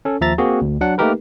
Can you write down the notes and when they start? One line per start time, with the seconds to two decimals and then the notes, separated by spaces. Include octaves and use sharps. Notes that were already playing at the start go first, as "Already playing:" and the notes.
0.05 C#4 A4
0.21 D#2 F3 E5 A#5 A6
0.38 A#3 C4 F#4 G#4
0.62 D2
0.81 F#3 D4 F#5
0.98 A3 A#3 D#4 G4 A#4 B4